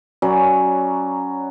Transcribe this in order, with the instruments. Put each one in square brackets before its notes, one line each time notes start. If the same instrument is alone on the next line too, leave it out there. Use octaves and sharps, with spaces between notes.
[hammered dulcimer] F#3 C#4 D5 B5